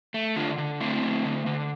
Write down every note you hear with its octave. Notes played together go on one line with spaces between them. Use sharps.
A3
D3 D4 F4
D3
A3 C4 E4
A3
D3
D3